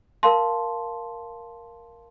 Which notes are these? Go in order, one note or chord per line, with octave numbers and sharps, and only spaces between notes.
A#4 F5 A5 C6